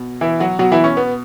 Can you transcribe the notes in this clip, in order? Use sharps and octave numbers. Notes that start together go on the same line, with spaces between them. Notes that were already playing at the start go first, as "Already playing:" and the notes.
Already playing: B2
E3 E4
F#3 F#4
B2 F#3 F#4
E3 E4
C#4
B3